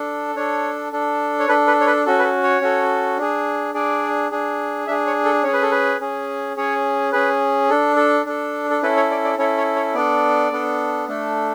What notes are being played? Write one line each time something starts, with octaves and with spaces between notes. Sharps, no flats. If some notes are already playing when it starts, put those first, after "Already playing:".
Already playing: D4 A4
D4 A4 C#5
D4 A4
C#5
D4 A4 B4
B4
C#5
B4
C#4 F#4 A4
B4
A4
C#5
C#4 F#4 A4
D4 G#4
D4 G#4 D5
D4 G#4
D4 G#4 E5
C#5
A4
C#4 G#4 C#5
B4
A4
B4
C#4 G#4
C#4 G#4 C#5
C#4 G#4 B4
D4 A4
A4
D4 A4
A4
C#4 E4 A4 B4
C#5
D5
D5
C#4 E4 A4 C#5
C#5
C#5
B3 D4 A4 D5
B3 D4 A4
A3 D4 A4